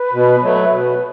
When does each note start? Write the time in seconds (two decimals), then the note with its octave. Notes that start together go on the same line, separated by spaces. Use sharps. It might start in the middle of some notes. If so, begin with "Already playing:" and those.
Already playing: B4
0.13 B2
0.42 F#3 A3
0.71 B2